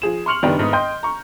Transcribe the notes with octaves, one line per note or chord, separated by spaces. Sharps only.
F3 G#4 E7
C6 C#6 F6 C#7 F7 F#7
F#1 D#3 G3 B3 D4 G5
G1 G#2 B3 D#6
D#5 G5 C6 G6
A#5 C#6